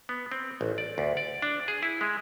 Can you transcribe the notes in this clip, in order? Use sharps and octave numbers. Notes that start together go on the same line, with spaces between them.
B3
C4
A1
D5
D2
D5
D4
G#4
E4
G#3